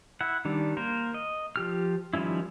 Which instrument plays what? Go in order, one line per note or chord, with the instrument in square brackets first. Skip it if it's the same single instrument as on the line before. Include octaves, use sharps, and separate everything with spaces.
[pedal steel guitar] E4 F#5
D#3 G3 D4
A#3 A#4 C5
D#5
F3 G4 F6
D#3 F3 G3 C#4 E4